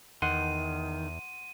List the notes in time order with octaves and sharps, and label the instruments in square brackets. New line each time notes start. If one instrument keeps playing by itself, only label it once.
[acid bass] E2 [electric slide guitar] D#3 [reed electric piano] F#5 C6 [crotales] D#7